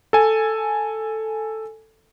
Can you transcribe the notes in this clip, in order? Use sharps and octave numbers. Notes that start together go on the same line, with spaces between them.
A4 G#5